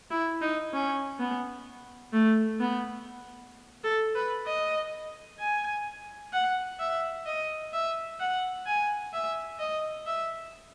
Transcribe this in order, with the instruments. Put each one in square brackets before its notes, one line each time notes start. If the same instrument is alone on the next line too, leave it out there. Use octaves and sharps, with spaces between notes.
[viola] E4
D#4
C#4
B3
A3
B3
A4
B4
D#5
G#5
F#5
E5
D#5
E5
F#5
G#5
E5
D#5
E5